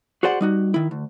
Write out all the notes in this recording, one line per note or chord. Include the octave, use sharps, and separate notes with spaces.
F#4 G#4 C5 D5 F#5
G3 D#4 F#4
D#3 E4
D2